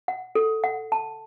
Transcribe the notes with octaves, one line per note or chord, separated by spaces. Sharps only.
F#5
A4
F#5
A5